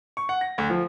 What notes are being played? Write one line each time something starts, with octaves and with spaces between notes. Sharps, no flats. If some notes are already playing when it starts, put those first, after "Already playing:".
C#6
F#5
A#6
D2
F3